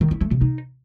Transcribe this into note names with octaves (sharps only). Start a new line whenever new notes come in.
D#3
E4
A3
C3
D#4